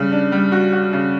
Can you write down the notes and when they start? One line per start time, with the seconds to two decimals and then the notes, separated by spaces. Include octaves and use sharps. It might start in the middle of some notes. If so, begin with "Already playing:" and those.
Already playing: C#3 G3
0.12 D4
0.32 G3
0.52 F#4
0.72 F#4
0.93 C#3